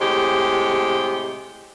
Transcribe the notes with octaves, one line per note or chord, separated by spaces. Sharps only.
A2 C3 G#3 G4